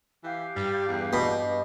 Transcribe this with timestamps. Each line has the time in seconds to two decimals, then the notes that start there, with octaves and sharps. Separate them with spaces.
0.24 E3 G4 F5
0.56 G2 G3
0.88 E2
1.13 B2